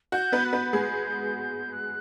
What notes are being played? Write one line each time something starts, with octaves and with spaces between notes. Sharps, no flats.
F#4 G6
B3 B4
F#6
B3 B4 G6
G#3 G#4
F#6